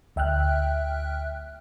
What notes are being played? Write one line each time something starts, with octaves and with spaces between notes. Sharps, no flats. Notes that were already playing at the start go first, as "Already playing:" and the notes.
D2 E5 G5 F6 F#6